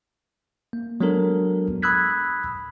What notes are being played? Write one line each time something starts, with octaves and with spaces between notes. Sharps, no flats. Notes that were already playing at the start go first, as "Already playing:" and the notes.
A#3
F#3 G#3 B3 D4 A4 A#4
B5 D#6 E6 F#6 G#6 B6